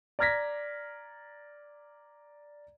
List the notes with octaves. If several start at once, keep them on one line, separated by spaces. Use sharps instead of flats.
D5 A#5 F6 G#6 A#6 B6